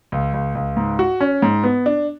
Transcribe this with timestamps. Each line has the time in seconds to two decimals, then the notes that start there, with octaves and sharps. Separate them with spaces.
0.12 C#2
0.34 C#2
0.55 C#2
0.77 G#2
0.99 F#4
1.20 C#4
1.42 G#2
1.64 B3
1.86 D4